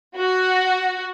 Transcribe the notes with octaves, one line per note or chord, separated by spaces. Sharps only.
F#4